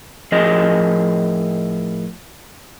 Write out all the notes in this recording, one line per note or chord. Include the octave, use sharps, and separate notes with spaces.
A2 F3 G#4 A#4 D#5